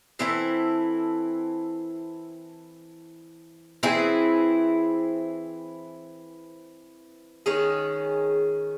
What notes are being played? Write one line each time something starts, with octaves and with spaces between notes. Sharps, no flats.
E3 C4 E4 A4
E3 C4 E4 G#4
D#3 G#3 C#4 G#4